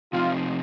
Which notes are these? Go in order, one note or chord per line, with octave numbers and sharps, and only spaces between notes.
C3 F3 C4 D#4 F4